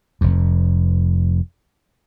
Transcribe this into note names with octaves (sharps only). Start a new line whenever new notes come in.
F1 F2